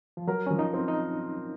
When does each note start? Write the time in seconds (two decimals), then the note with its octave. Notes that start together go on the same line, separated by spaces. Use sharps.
0.17 F3
0.28 F#3 A#4
0.47 F3 C#4
0.59 D#4
0.73 C4
0.88 D#4